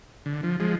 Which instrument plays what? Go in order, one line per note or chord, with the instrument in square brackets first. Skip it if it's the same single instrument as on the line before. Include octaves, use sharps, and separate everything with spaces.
[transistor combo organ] D3
F3
F3 G#3